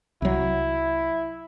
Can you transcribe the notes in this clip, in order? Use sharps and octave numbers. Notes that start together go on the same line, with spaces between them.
C2 F#3 E4